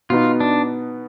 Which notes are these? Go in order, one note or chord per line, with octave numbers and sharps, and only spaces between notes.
B2 B3 D#4 F4
D4